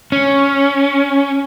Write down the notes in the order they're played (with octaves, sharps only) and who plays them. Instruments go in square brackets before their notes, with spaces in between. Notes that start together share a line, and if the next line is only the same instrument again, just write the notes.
[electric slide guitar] C#4